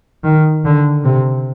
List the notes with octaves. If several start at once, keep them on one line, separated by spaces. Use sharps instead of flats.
D#3
D3
C3